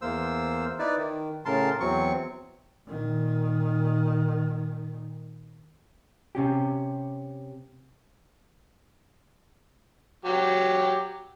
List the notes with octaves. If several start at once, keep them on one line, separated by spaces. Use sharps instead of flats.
E2 A#3 C5 E6
D#4 E4 B4 D5
D#3
A2 C#3 A#4 A5 C6
E2 F#3 C4 C#6
A#2 D#3
C3 C#4 G4
F#3 G4